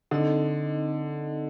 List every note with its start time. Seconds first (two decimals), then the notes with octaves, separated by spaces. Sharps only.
0.11 D3 C4 D#4 A4 D#5